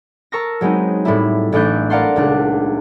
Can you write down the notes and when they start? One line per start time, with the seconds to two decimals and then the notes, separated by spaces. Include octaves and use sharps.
0.32 A#4 A5 C#6 E6 A#6
0.61 F#3 G#3 B3 C4 D#4
1.05 A2 G3 E4
1.52 A1 A2 A3 D4 F#6 G6
1.90 A#4 D5 F5 F#5 A5 C6
2.16 D#1 C#2 D4 F#6